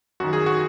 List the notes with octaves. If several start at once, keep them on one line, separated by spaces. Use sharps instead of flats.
F#2 D#3 F#4
G#4
F#4